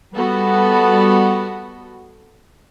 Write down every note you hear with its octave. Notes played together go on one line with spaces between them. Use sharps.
G3 B3 F#4 A4